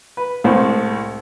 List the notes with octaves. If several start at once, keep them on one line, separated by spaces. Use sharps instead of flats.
B4
C2 A2 G#3 C5